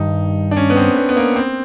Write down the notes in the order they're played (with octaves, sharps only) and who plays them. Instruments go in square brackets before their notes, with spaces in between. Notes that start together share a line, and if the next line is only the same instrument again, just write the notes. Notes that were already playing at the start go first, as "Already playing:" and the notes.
Already playing: [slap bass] G2 D#3 G3 [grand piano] D#4
[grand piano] D4
C#4
B3
C4
B3
B3
A#3
C4